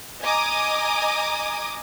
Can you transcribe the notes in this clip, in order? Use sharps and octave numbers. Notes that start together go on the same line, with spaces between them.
D#5 G#5 A#5 D6 D#6